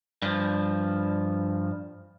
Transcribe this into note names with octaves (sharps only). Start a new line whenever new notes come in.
G2 F3